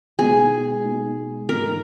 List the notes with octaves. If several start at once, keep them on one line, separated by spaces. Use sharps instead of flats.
B2 G#3 D#4 F#4 G#4
B2 G#3 D#4 F#4
G#2 E3 B3 A#4